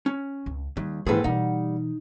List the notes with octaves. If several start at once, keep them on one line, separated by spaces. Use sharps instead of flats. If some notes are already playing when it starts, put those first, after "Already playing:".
C#4
C#2
D#2 G3
G#2 D#3 E3 A#3 G#4 A4 B4
B2 E3 G3 D#4 F#5